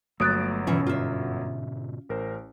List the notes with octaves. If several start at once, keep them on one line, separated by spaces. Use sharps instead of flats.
G1 F#3 A3 A#3 D#6 F#6 A6 D7
G#2 B2 D3 E3 F3 C#4
F4 E5
A1 A#4 C5